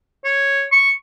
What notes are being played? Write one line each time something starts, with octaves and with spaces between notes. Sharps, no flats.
C#5
C#6